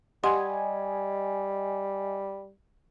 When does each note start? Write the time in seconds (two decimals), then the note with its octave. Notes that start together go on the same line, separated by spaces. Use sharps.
0.24 G3 G4 D#5 F#5 G#5 C6